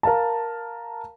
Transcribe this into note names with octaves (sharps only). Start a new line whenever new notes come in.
A#4 F5 A5